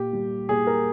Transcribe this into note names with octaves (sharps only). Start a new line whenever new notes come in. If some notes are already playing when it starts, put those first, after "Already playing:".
Already playing: A#2 G4
G3
A#2 G#4
A#4